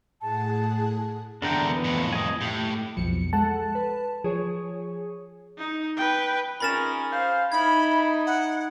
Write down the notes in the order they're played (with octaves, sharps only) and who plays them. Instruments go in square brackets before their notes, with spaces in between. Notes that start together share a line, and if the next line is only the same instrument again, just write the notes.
[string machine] A2 G#4 F#5 [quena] A5
[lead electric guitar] E2 D3 [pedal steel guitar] D4 A#4 G5
[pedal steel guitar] E3 B3
[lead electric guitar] F2 A2
[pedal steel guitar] D#5 G#5
[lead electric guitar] A2 [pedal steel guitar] G4
[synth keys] B1 F2 C#7 [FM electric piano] F3
[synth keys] G#3 A4 F#5 [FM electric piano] A5
[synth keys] B4
[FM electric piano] F3 [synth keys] G#4 C#5
[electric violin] D#4
B4 G5
[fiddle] C#4 G#4 [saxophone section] D#4 F4 A#4 [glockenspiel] B5 A6 E7
[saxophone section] C5 F5
[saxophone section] D#4 [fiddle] E4 D#5 [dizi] B5 [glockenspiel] G#6
[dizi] F#5